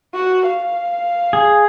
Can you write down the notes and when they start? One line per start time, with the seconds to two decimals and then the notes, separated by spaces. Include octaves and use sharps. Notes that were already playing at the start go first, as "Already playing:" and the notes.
0.14 F#4
0.47 F5
1.33 G#4